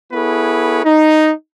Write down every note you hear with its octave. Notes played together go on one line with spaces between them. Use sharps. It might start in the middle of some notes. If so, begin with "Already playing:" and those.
B3 E4 G#4 A4 B4 C#5
D#4